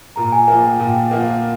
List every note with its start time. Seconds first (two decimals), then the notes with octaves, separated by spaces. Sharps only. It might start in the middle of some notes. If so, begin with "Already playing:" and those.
0.16 A#2 A#5
0.32 G#5
0.48 F3 A#3 G#5
0.64 G5
0.80 A#2 G5
1.11 F3 A#3 F#5